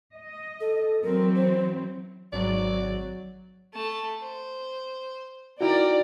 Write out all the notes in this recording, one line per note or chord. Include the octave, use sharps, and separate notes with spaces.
D#5
A4
E3 F#3 C4 A#4
C5
G#1 F#3 D5
A3 A5
C5
D#4 E4 F#4 A#4 D5 G5